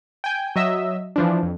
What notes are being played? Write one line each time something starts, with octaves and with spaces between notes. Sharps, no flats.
G5 G#5 G6
F#3 D#5 E5 E6
E3 F3 D4
F2